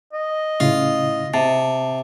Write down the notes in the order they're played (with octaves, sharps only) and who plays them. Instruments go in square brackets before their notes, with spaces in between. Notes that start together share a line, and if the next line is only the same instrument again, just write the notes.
[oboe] D#5
[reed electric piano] A2 C#3 E4 [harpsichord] F4
[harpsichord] C3 [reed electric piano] A5